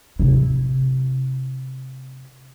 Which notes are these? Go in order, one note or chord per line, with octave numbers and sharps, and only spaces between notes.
C3 E4